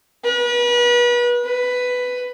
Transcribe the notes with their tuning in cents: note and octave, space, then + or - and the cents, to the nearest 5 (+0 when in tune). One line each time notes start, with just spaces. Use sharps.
B4 -35
B4 +5